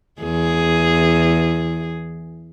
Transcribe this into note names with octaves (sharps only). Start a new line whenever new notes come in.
E2 G#4